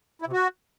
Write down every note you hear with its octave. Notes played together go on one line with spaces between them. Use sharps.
E4
C3
F#4